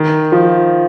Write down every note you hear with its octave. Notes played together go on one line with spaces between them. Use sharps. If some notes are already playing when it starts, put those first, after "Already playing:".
Already playing: D#3
F3